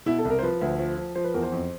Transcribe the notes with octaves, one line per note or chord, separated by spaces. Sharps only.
B2 E4
A4
C2 A#4
C5
F3 B4
D2
F3
F3
F3 C5
B4
E2 A#4
C5
F2